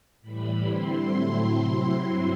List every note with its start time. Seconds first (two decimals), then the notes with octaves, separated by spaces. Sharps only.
0.22 A2 E3 G3 B5
0.67 D3 G3 C4 E4 C6
1.12 A2 F#3 A3 C4 E4
1.57 C3 F#3 C4 E4 C6
2.01 G2 F#3 C4 E4